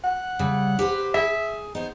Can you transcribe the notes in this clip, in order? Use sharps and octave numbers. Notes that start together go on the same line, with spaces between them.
F#5
C#3 G3
G4 B4 C5
G#4 E5
B3 D#4 C5